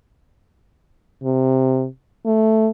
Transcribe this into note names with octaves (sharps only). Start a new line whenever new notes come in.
C3
A3